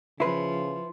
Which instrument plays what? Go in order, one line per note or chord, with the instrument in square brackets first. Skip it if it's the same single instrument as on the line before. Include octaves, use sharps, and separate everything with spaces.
[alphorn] C#3 [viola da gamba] F3 [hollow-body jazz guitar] E4 B4 [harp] C6